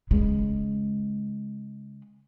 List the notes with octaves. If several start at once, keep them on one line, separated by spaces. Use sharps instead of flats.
C#3 G#3